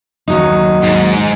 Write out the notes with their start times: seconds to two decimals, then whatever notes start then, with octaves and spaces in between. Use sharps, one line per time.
0.28 D#2 F#3 D#4
0.82 G#2